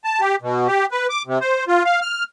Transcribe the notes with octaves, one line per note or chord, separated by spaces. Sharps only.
A5
G4
B2
G4
B4
D6
C3
C5
F4
F5
F6